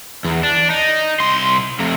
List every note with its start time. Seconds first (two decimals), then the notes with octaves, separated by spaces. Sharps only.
0.25 E2
0.43 D4
0.70 D#4
1.20 C2 C6
1.79 F2 C3